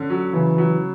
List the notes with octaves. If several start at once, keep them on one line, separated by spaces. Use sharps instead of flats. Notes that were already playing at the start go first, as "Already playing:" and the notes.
Already playing: D3 C#4
F#3
C#3 E3
F#3